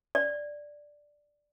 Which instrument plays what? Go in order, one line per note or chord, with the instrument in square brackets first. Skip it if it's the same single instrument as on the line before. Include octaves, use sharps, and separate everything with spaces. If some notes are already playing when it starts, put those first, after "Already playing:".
[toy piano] D5